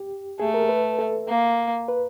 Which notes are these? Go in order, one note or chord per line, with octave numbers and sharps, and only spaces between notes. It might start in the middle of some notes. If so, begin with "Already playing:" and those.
Already playing: G4
A3 G#4
A#4
B4
A4
A#3
B4